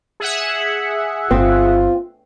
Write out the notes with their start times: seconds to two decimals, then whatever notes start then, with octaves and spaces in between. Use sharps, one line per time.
0.20 G#4 E5 F#5
1.31 G1 C4 F4